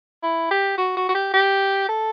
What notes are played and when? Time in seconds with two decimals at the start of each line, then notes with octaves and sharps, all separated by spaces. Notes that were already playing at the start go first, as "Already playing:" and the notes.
0.23 E4
0.51 G4
0.78 F#4
0.97 F#4
1.09 F#4
1.14 G4
1.33 G4
1.89 A4